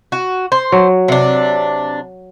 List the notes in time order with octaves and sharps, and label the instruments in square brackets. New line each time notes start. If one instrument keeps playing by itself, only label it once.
[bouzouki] F#4
C5
[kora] F#3
[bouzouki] C3 D4